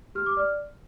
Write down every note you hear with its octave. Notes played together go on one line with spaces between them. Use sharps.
G4 F6
D6
D5 F6